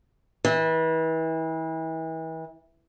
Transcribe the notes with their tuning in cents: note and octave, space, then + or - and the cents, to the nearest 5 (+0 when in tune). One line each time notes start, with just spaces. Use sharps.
E3 -35